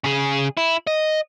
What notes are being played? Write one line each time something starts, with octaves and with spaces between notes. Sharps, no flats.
C#3 G#4
E4
D#5